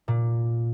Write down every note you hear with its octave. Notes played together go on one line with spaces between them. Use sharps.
A#2